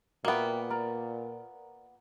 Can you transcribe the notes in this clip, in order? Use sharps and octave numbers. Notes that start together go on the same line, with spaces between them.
A#2 A#3 B3 F#4 E5 G5
A#4 D5 A#5